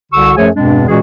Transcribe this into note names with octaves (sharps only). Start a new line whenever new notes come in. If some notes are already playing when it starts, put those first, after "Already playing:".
C2 D3 F#4 C#6 E6
F#2 F3 A3 G#4 C#5 G#5
E2 G2 B2 G#3 C4 D4
A#2 E3 G#3 C#4 F#4 G#4